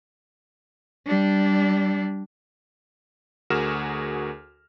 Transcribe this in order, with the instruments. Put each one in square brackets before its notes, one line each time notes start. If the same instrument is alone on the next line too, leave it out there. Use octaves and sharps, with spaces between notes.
[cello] G3 D4
[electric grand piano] D2 F#4 G#4 A#4 F6 E7